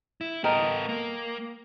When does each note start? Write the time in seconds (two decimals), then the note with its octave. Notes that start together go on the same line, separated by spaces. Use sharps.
0.21 E4
0.44 B3 A4 A#4 D#5 G5
0.89 A#3